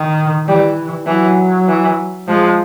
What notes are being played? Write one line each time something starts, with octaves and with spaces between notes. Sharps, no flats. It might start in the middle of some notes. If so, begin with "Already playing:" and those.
Already playing: D#3
E3 G3
E3 F#3
E3
F3 G#3